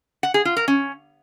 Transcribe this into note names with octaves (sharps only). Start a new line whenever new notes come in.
F#5
G#4
F4
A#4
C#4